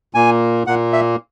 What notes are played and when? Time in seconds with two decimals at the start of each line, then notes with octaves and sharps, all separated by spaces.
0.14 A#2 A#3 G#5
0.67 A#2 A#3 F#5
0.93 E5